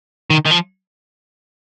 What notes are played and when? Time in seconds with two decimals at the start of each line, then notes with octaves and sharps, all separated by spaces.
0.30 D#3
0.45 D#3
0.51 F3